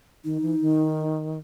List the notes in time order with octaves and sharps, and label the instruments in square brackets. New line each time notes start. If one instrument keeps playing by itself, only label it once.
[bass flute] D#3 [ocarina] D#4
[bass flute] E3
D#3